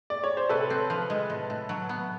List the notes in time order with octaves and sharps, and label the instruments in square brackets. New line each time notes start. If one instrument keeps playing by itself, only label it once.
[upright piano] D5
C#5
C5
[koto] C3 [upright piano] A4 B4
[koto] C4
F3
G#3
A2
A2
F#3
B3